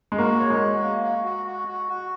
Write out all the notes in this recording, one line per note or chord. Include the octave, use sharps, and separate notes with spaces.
G#3
A#3 F#4
C#5
G#3
F#4
A#3
F#4
F#4
F#4
F#4
F#4